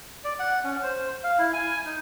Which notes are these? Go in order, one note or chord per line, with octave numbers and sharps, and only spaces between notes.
D5
F#5
C#4
C5
F5
E4
G#5
D#4